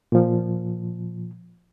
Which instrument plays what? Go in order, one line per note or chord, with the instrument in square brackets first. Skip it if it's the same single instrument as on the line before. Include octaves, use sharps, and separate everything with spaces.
[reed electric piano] A#2 F3